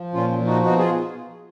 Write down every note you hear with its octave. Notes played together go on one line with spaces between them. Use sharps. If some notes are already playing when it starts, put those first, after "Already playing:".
Already playing: F3
A#2 C#4 F4
F3
D#4 F#4
B2 D#4 F#4
F4 G#4